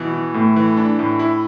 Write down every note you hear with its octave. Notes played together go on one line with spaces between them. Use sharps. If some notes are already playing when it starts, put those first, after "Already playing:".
Already playing: B2 E3
E3
A2 A3
E3
D4
A2
E4